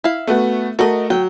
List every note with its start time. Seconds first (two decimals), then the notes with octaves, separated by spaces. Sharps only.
0.04 E4 F5
0.27 A3 B3 F#4
0.79 A3 F#4 A4 A#4 D#5
1.10 F#3 G5